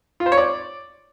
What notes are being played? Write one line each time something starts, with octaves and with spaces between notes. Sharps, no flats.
F4
C5
C#5
D5